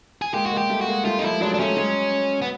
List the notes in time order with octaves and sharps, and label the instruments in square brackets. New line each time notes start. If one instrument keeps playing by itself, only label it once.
[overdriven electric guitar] G#4
[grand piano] G#3 A#3 [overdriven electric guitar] G4
[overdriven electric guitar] F#4
[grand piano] G#3 A#3
[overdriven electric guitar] G4
[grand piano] G3 A3
[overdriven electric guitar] F#4
[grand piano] G#3 A#3
[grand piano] G3 A3 [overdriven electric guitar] F4
[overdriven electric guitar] D#4
[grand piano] F3 G3 [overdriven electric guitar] E4
[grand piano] F#3 G#3 [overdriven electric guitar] D4
[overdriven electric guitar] D4
[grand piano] G3 A3 [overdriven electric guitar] C#4
[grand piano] F#3 G#3
[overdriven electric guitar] B3